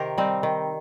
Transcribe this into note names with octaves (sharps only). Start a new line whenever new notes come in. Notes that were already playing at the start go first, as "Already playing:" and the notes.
Already playing: C3 D#3 G4 A#4 C5
G3 C4 D#4
D#3